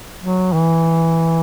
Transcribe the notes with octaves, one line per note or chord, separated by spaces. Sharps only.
F#3
E3